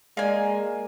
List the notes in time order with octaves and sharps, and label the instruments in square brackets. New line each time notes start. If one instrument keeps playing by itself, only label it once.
[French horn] G#3 [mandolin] A#3 G#5 [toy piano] D5 F5